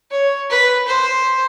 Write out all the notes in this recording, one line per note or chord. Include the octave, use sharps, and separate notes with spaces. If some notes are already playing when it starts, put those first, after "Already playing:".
C#5
B4
C5